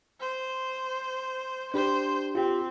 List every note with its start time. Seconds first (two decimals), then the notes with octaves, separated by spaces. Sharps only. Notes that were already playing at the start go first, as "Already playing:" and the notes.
0.20 C5
1.74 D4 G4 C5
2.35 C4 F4 G4